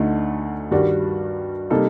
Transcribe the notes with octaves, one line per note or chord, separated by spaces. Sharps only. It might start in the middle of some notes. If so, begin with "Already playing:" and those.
Already playing: D2 D3 A3 D#4
G2 D#3 G3 D4 F#4
C3 G3 A#3 D#4 A4